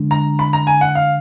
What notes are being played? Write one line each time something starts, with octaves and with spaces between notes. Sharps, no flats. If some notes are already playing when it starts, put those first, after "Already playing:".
Already playing: D3 G#3 D4
A#5
B5
A#5
G#5
F#5
F5